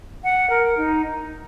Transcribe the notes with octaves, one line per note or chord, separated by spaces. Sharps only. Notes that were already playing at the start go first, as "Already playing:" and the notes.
F#5
A#4
D#4